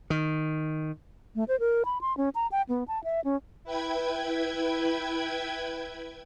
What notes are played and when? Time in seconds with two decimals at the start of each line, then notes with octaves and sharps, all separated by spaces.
0.10 D#3
1.35 A3
1.48 C5
1.60 A#4
1.85 B5
2.01 C6
2.17 C#4
2.35 A#5
2.52 G5
2.69 B3
2.88 A5
3.04 E5
3.24 C#4
3.64 E4 B4 G5 G#6